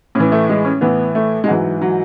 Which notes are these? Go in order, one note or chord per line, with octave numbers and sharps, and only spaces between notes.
A2 E3 C#4
A3
G#3
C#4
A2 E3 B3
A3
G#3
G#2 E3 F#3
F#3